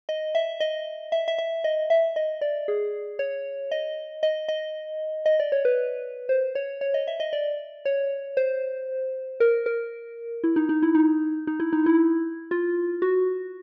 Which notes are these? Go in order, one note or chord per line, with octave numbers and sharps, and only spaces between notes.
D#5
E5
D#5
E5
E5
E5
D#5
E5
D#5
D5
G#4
C#5
D#5
D#5
D#5
D#5
D5
C#5
B4
C5
C#5
C#5
D#5
E5
D#5
D5
C#5
C5
A#4
A#4
E4
D#4
D#4
E4
D#4
D#4
E4
D#4
E4
F4
F#4